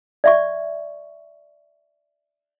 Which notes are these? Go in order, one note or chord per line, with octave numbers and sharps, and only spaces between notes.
D5 E5 C#6